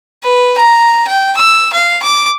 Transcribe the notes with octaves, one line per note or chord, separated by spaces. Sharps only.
B4
A#5
G5
E6
F5
D6